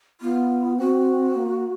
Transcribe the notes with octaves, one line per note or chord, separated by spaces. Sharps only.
B3 F4
C4 F#4
A#3